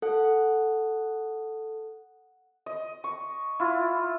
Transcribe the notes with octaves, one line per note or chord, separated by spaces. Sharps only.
A4 F#5
D#5
C#6
E4 F4